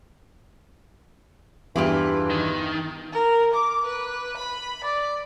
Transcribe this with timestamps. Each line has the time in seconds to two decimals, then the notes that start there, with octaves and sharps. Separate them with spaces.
1.76 E2 G2 E3 D4 E4 F4 G4
2.30 D#3
3.12 A#4
3.54 D6
3.85 B4
4.37 B5
4.84 D5